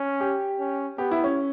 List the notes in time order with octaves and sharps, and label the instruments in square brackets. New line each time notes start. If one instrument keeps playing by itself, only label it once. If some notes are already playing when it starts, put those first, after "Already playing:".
Already playing: [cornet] C#4
[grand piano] G4
[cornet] C#4
[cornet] B3 [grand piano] G4
[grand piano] E4
C#4